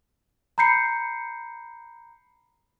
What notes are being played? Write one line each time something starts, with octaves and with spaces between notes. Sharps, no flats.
A#5 B5 G6 C7 C#7